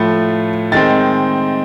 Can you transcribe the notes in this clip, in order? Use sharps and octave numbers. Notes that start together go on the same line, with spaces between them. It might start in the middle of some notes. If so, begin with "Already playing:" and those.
Already playing: A2 F3 A3
D#3 G#3 C4 A6